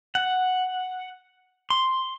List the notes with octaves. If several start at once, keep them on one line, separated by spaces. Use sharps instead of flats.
F#5
C6